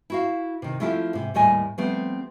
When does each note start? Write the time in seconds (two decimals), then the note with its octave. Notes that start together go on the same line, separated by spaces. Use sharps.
0.10 E4 F#4 F5
0.62 C3 D#3
0.80 F3 A3 C4 E4 F4 G4
1.13 G#2 C3
1.34 D#2 A2 G3 D#5 G#5
1.78 F3 G3 A3 B3 C4